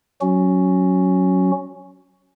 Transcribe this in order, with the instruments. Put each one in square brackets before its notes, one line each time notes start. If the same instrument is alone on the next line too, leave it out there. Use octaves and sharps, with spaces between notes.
[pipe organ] F#3 C#4 F#4